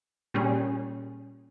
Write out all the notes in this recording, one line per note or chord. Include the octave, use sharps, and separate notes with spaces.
A#2 G3 C#4 G#4